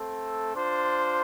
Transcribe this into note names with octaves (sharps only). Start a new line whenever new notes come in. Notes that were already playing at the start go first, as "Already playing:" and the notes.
Already playing: A3 C4 A4
D4 F4 C5